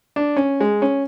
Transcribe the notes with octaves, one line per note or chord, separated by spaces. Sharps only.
D4
C#4
G#3
C#4